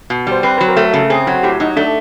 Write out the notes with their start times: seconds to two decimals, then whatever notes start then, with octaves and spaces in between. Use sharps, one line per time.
0.10 B2
0.27 G3 C5
0.43 C4 B4
0.58 F#3 B4
0.68 A#4
0.77 A3
0.94 C#3 A4
1.10 C4 G#4
1.27 F#3 F#4
1.43 A2 G4
1.60 F#3 D#4
1.76 A3 D4